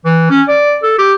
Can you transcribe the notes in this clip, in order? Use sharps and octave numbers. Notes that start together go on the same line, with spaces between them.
E3
C#4
D5
A4
G4